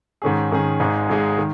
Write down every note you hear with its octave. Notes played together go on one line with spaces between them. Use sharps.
G#2 D#3 C#4 G#4
G#2 D#3 C#4 G#4
G#1 G#2 G#3 D#4 G#4
G#1 G#2 G#3 D#4 G#4
D#3